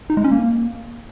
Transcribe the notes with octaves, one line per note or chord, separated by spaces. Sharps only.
D#4
G#3
C#4
A#3